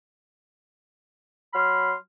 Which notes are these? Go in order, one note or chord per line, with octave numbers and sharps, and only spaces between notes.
F#3 B5 C6 F6